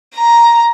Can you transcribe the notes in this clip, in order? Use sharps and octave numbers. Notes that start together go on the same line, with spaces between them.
A#5